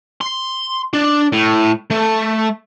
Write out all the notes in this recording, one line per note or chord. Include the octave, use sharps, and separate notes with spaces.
C6
D4
A2
A3